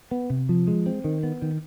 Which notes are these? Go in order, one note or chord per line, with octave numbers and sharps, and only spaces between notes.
B3
C3
F3
G#3
C4
D#3
B3
D#3